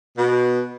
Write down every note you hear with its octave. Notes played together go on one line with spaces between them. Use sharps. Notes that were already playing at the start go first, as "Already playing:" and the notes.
B2